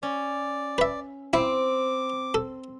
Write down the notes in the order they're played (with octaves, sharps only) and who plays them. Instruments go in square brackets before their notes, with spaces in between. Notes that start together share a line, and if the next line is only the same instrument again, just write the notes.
[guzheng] C#4 [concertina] D5
[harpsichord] B4 E5
[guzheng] C4 [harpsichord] E4 [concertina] D6
[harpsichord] A4